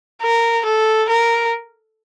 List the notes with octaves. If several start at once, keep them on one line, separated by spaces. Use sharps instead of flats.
A#4
A4
A#4